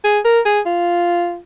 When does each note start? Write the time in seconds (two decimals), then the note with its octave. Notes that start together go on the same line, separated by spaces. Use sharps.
0.04 G#4
0.25 A#4
0.45 G#4
0.66 F4